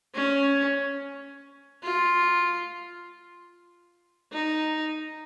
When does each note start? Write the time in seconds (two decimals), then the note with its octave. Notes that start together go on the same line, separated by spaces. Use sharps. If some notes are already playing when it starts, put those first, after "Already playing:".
0.15 C#4
1.83 F4
4.33 D#4